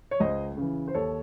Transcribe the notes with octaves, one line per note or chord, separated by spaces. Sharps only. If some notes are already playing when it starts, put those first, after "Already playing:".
C#5
C#2 C5 D#5
C#3 E3
C5
D#2 A4 C#5